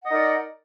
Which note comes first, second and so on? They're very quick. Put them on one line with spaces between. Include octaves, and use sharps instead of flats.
F#5 D#5 D#4 A#4 D5